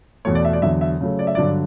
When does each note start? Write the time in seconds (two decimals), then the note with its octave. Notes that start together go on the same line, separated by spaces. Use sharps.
0.25 E2 B2 A3 C#5
0.35 D5
0.45 E5
0.53 D5
0.62 E2 D3 F#3 E5
0.81 E5
1.01 C#3 F#3 A3
1.19 D5
1.27 E5
1.35 G2 D3 F#3 D5